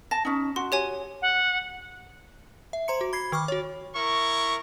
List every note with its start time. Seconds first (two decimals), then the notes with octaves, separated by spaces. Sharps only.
0.11 A5 A#6
0.25 C#4 D#4
0.56 F#4 C6
0.72 G4 C#5 G#5
1.22 F#5
2.73 E5
2.88 C5 A#5 C6 C#7
3.01 F#4
3.13 B5 G#6 C7
3.32 D#3 C#6 D6 F6
3.48 F#4 C#5
3.95 E4 A#4 C#6